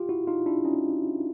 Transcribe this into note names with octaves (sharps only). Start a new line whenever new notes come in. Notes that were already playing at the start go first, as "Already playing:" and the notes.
Already playing: F4 G4
E4 F#4
D#4 F4
D4 E4
C#4 D#4